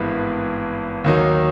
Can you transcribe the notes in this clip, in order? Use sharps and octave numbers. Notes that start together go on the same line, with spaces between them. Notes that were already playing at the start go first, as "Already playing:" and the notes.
Already playing: G#1 G2 E3 G#3 B3
D#2 D#3 F#3 A#3 D#4